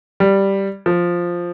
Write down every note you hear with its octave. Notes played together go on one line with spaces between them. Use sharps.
G3
F3